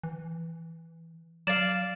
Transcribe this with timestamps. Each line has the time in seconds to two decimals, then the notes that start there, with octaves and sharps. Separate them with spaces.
0.03 E3
1.47 F#3 D5 F5 A6 E7